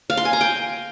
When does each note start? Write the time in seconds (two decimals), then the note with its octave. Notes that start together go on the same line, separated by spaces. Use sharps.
0.10 F5
0.17 C6
0.25 G#5
0.33 A#5
0.41 G5